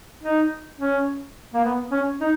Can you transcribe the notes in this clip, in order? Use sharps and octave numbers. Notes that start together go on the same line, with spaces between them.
D#4
C#4
A#3
B3
C#4
D#4